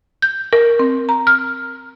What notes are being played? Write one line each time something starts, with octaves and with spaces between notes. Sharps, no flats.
G6
A#4
C4
A#5
F6